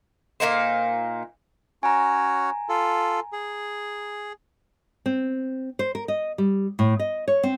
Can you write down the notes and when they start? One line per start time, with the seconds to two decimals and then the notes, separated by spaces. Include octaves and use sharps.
0.40 A#2 A#3 D#4 C5
1.83 C#4 F#4 C#5 G#5 A#5
2.69 F4 A4
3.33 G#4
5.06 C4
5.79 C5
5.95 A#4
6.08 D#5
6.38 G3
6.79 A2
6.99 D#5
7.28 C#5
7.43 C4